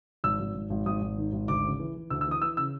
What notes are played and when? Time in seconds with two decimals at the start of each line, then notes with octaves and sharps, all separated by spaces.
0.24 G#1 E6
0.40 G#1
0.55 G#1
0.70 G#1
0.86 G#1 D#6
1.02 G#1
1.17 D#3
1.33 G#1
1.48 D2 D6
1.64 C#3
1.79 E3
1.95 E3
2.10 D2 E6
2.21 E6
2.27 E3 D#6
2.41 E3 E6
2.57 C#3 E6